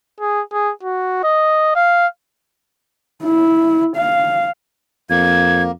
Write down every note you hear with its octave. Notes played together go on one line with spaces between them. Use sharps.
G#4
G#4
F#4
D#5
F5
E4
F5
F2 A#3 G#6